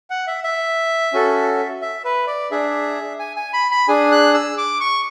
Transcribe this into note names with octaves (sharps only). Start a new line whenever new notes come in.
F#5
E5
E5
C#4 F#4 A4
E5
B4
D5
D4 G#4 E5
G#5
G#5
B5
B5
D4 G#4 G#5
F#6
E6
D6
C#6